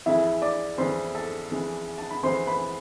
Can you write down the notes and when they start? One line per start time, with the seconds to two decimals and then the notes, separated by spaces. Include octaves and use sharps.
0.06 F2 E3 G#3 E4 E5
0.42 D5 D6
0.78 F2 E3 G#3 C5 C6
1.15 A4 A5
1.51 F2 E3 G#3
1.98 A5
2.11 B5
2.23 F2 E3 G#3 C5 C6
2.47 B4 B5